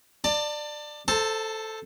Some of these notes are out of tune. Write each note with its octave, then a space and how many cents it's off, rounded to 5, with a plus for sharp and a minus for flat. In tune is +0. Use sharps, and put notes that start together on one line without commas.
D5 +20 A5 +35
A4 +0 C5 +0 A5 +40